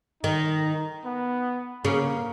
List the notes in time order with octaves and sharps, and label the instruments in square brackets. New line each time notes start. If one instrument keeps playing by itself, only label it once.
[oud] D#3 [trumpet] D#4
[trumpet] B3
[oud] C#3 [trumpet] A#3